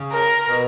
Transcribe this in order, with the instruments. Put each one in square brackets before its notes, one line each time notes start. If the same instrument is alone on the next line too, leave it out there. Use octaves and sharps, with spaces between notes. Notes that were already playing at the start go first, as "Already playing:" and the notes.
Already playing: [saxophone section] C#3
[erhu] A#4
[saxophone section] B2